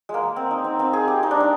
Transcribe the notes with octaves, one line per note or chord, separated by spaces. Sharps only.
G#3 A#3
C4
D#4
C4
C4
G#4
G4
D#4
D4
D#4